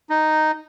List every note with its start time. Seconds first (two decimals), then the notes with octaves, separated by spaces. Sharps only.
0.10 D#4